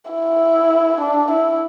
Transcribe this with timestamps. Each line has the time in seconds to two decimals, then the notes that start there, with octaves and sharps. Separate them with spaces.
0.11 E4
1.01 D4
1.31 E4